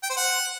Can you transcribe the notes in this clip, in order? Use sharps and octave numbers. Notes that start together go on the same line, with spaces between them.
G5
C5
F#5